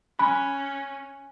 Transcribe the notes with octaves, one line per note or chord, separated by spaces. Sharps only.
C#4 G#5 B5 F#6